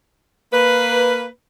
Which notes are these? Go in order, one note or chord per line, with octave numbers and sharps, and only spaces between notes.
A#3 B4